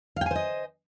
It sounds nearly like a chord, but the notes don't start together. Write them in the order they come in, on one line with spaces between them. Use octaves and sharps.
F5 G5 G#5 C5 D#5